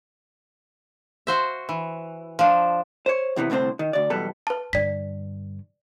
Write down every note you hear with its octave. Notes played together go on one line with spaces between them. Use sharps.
F#4 C5 E5
E3
F3 D4
C5 C#5
E2 C3 E3 B3
C2 A2 D3 C4 C5
D#3
D2 D5
B1 E2 G3 B3 A4
B4 A5
G2 D3 D5 B6